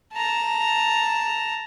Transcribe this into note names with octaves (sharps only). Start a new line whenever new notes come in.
A5 A#5